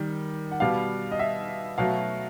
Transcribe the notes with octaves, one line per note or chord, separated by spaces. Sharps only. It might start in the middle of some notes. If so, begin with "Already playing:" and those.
Already playing: D#3 G3
F#5
B2 G3 B3 F5
D#5
E5
B2 F#3 A3 F5